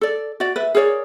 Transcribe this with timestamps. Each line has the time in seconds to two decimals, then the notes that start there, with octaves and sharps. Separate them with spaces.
0.01 A4 D5
0.40 F#4 D5
0.56 B4 E5
0.75 G#4 A#4 C#5 D5